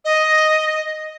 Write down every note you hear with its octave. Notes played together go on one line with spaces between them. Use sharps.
D#5